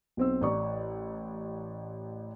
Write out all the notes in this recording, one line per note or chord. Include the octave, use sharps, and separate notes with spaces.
B1 C4 E6
A1 D5 A#5 C#6